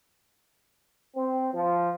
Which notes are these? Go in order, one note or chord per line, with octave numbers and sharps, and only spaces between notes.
C4
F3